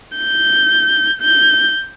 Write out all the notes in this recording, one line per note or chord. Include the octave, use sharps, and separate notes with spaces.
G6
G6